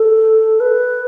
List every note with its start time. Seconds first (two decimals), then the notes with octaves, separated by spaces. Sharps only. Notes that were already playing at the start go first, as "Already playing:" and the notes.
Already playing: A4
0.60 B4